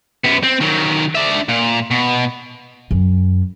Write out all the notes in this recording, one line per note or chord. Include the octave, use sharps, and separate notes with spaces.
F#2 B3
C4
D#3 F#3
D4 E5
A#2
B2
F#2